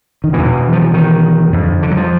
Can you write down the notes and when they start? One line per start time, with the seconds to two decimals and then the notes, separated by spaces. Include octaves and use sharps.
0.24 D#3
0.33 E2 B2 E3
0.73 F3
0.83 E3
0.94 D#3
1.52 F2 D3
1.82 D3
1.91 F#3
1.97 F3